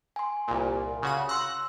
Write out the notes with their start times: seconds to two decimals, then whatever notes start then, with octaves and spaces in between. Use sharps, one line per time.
0.16 G#5 C6
0.48 C2 A#2
1.03 C#3 F#4 D#7
1.29 C6 E6 F#6 A#6 C#7